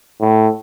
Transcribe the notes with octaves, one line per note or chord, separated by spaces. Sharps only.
A2